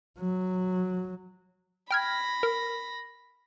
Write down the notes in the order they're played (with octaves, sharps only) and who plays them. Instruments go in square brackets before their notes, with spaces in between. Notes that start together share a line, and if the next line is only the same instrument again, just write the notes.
[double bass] F#3
[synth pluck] G5 F6 G#6 [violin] B5 A#6
[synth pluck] A#4